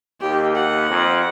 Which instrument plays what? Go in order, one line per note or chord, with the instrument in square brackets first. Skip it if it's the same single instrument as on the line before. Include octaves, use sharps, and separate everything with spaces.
[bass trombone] D#2 [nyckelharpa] G4
[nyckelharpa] F#5
[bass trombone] F2